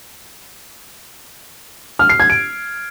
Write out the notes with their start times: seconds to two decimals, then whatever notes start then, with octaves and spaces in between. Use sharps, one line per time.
1.99 F6
2.09 C7
2.20 G#6
2.30 D7